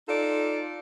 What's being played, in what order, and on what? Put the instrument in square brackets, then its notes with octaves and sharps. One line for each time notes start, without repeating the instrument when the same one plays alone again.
[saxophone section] D#4 F4 A4 D5